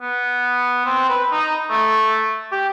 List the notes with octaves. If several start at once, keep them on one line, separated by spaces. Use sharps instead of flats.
B3
C4
B4
D#4
A3
G4